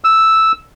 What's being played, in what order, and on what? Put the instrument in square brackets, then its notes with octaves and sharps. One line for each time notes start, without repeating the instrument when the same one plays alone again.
[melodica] E6